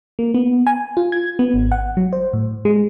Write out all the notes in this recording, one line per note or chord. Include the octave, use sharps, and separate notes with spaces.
A#3
B3
G#5
F4
G#6
B3
G#1
F#5
F#3
C5
A2
G#3